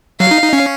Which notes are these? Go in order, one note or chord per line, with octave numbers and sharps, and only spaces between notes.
F#3 F5
D#4
D#4
C#4